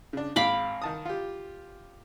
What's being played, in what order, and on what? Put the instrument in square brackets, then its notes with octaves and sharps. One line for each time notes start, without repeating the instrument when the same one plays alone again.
[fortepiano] C#3 D4
[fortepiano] G#1 [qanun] F5 B5 D6
[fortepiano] D#3 A5 D#6
F4 G4